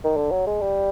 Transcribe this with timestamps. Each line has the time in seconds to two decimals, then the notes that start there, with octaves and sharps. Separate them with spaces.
0.04 D#3
0.16 D3
0.31 F#3
0.47 G#3
0.61 G3